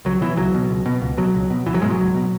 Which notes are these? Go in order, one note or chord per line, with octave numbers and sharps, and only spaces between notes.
C#2 F#3
B2 E3
C#2 F#3
B2
C#2
B2
C#2
B2 F#3
C#2
B2
C#2 E3
F#3
G#2 B2 G#3
F#3
C#2
B2